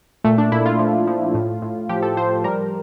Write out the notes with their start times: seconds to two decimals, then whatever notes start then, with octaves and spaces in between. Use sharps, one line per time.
0.24 A#2 A3
0.38 D4
0.52 A#2 E4
0.66 F4
0.79 F3
1.07 F3
1.34 A2
1.62 A2
1.89 F3 G4
2.02 A4
2.17 F3 C5
2.44 G3 A#4